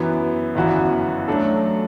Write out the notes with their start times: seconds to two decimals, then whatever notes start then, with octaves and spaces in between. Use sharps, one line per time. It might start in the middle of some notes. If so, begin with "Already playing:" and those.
Already playing: F#2 E3 B3
0.55 G1 F#2 E3 B3 F#4
1.28 F#2 F#3 A3 D4 A4